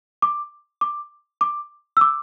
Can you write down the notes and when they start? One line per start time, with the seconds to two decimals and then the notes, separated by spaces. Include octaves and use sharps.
0.22 D6
0.81 D6
1.41 D6
1.97 E6
2.01 D6